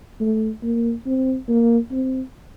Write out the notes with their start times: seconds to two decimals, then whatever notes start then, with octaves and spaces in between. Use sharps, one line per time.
0.20 A3
0.63 A#3
1.06 C4
1.48 A#3
1.91 C4